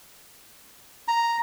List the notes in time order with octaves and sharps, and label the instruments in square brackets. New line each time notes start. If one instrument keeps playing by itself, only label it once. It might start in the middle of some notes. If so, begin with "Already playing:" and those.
[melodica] A#5